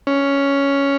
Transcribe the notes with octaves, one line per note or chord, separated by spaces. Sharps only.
C#4